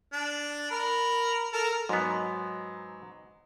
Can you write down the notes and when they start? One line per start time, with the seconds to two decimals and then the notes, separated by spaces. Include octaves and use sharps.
0.13 D4
0.71 A#4 B5
1.53 A4 A#4
1.89 G#2 F#3 B3 D#4